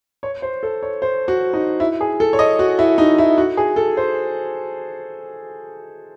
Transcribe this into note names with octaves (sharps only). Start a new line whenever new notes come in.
C#5
C5
A4
C#5
C5
F#4
D#4
E4
G#4
A4
C#5
D#5
F#4
E4
D#4
E4
F#4
G#4
A4
C5